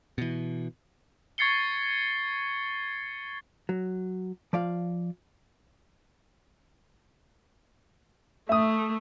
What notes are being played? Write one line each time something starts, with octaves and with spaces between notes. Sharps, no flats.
B2 E3
C#6 G#6 A6 C7 C#7 G7
F#3
F3 D5 F5
A3 E5 D#6